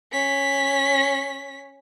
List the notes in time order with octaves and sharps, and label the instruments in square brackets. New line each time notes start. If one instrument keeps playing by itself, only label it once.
[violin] C#4 B6